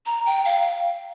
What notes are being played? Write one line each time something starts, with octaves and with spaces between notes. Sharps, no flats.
A#5
G5
F5